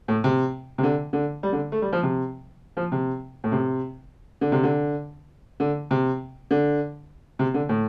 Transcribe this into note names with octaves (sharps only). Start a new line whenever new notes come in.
A2
C3
C3
D3
D3
G3
D3
A3
G3
F3
C3
F3
C3
A2
C3
D3
C3
D3
D3
C3
D3
C3
D3
A2